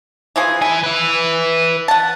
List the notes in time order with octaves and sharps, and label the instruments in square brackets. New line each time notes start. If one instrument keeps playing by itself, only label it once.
[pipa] E3 F3 G#4
[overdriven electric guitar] E3 G#5 [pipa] E4
[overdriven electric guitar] B4 E5
[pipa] F#5 A5